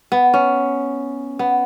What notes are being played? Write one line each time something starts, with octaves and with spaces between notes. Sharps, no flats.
B3
C#4
B3